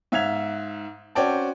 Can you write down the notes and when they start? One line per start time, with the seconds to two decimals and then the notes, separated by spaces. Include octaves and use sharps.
0.12 G#2 E5 F5 G#6 F7
1.15 C4 C#4 F#4 D5 G5 A5